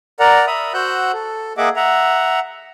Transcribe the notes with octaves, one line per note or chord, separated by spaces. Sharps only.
A#4 D5 F#5 A#5
E5 A#5 B5 D#6
F#4 C5 F#5 E6 F#6 G6
A4
A#3 G#4 D#5 E5 F#5 D6
E5 F#5 A#5